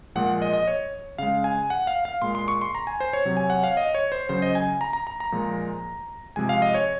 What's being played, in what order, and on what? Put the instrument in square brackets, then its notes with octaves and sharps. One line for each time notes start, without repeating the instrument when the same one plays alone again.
[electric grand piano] A#2 F3 G#3 F#5
D#5
D#5
C#5
C#3 G#3 F5
G#5
F#5
F5
F5
A#2 G#3 C6
C6
C#6
C6
A#5
G#5
C5
C#5
C3 F#3
G#5
F#5
F5
D#5
C#5
C5
C#3 F#3 C5
D#5
G#5
A#5
A#5
A#5
A#5
A#2 F3 G#3
C3 F3 G#3 G#5
F5
D#5
C#5